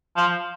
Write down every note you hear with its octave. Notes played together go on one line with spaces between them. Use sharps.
F3